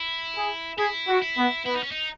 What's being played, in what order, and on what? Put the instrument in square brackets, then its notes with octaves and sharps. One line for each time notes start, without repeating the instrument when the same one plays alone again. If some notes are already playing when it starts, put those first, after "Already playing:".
Already playing: [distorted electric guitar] E4
[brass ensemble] G#4
[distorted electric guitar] E4 [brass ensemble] G#4
[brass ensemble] F#4
[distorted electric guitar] E4
[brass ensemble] B3
[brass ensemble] B3 [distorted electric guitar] E4
[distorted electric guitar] D#4
C#4
D#4